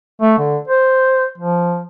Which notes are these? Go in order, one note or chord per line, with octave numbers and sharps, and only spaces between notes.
A3
D3
C5
F3